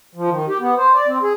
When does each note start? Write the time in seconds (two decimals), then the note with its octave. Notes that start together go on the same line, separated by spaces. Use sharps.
0.15 F3
0.30 D#3
0.48 G4
0.60 B3
0.77 C5
0.94 D5
1.08 C4
1.23 G#4